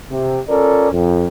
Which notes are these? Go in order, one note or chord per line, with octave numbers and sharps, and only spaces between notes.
C3
C#4 F4 A4 A#4 D5
F2